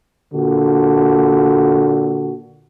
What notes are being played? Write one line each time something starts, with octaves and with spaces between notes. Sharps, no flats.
A#2 D3 F#4